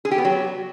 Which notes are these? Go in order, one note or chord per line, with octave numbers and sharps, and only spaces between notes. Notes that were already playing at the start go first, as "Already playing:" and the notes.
G#4
G4
B3
F#3